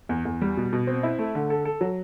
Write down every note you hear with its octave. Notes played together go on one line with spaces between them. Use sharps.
E2
E2
G3
B2
B2
C4
E4
A3
D3
A4
A4
F#3